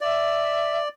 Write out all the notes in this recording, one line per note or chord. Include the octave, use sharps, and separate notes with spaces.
D5 E5